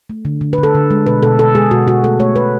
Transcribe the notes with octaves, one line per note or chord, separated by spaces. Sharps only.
A3
D3
D3
B4
D3
A4
D3
G#3
B2 B4
B2 A4
B2 A4
G#3 G#4
B2 F#4
B2 F#4
A3 A4
A3 C#5
A3 B4